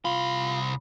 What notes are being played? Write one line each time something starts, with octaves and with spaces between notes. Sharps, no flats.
C2 F4 B5